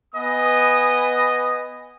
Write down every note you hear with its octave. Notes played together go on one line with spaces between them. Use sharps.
B3 D#5 G#5 D#6